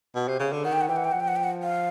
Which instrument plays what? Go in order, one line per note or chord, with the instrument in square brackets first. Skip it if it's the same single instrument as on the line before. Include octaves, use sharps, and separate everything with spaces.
[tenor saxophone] B2
C3
C#3
D3
[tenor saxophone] D#3 [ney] F#5
[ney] G5
F#5
[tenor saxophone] E3 [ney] G5
[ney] F#5
G5
[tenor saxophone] F3 [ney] F#5
[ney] G5
F#5
G5
F#5
F5